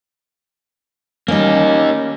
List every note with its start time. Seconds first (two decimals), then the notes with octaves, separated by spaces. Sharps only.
1.28 G3 A#3 C#4 D#4